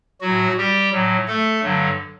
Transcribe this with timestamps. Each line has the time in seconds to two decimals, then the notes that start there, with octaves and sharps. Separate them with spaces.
0.21 A2 F#3 F#4
0.58 G3 G4
0.92 A2 F#3
1.27 A3 A4
1.63 G2 D3 F#3